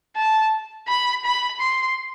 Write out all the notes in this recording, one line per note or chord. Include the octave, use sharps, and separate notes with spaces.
A5
B5
B5
C6